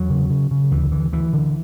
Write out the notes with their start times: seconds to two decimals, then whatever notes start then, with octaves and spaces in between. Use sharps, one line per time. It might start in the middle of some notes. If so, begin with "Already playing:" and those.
Already playing: E2 F#3
0.10 C#3
0.30 C#3
0.51 C#3
0.71 D2 E3
0.92 D3 E3
1.12 D2 E3
1.33 D3